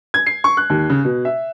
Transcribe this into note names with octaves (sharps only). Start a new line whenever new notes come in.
G#6
C7
C#6
F#6
D#2
C#3
B2
E5